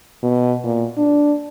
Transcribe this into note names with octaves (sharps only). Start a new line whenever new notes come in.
B2
A#2
D4